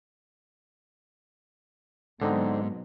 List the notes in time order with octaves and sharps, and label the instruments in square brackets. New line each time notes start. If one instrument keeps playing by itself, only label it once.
[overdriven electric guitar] G#2 [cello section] B2 F#3 [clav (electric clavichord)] D3 C4 D#4